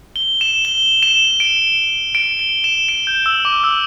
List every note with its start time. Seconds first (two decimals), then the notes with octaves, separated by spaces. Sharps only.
0.16 G7
0.41 E7
0.65 G7
1.03 E7
1.40 D7
2.15 D7
2.39 G7
2.64 E7
2.89 D7
3.07 G6
3.26 E6
3.45 D6
3.64 E6